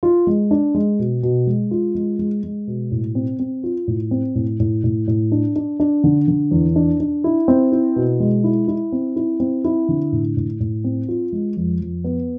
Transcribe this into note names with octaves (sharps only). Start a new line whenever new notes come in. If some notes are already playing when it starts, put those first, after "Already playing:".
F4
G#3
D4
G#3
B2
B2
G#3
F4
G#3
G#3
G#3
B2
A2
C4
C4
F4
A2
C4
A2
A2
A2
A2
D4
D4
D4
D3
D3
E2
D4
D4
E4
C4
E4
B2
G#3
E4
E4
C4
E4
C4
E4
D3
A2
A2
A2
C4
F4
G#3
F2
F2
B3